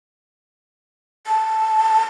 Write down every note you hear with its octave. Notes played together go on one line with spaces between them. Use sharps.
A5